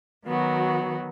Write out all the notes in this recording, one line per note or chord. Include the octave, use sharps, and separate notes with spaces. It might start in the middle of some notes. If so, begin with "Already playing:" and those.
D#3 F#3 B3 F#4